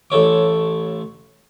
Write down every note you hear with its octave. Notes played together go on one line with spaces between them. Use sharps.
A1 A4 C#5 D6